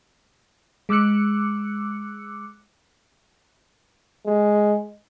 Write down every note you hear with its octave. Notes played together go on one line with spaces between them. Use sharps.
G#3 D6 E6 F#6 C#7
G#3